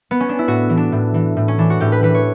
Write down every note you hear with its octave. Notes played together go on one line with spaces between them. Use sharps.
B3
C#4
D4
E4
A2 F#4
E3
D4
A2
E3
A2
C#4
E3 D4
F#4
A2 G4
B4
E3 B4
C#5